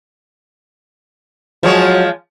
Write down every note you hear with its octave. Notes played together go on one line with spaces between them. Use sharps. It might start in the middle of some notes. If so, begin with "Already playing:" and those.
F3 F#3 G#3 C#5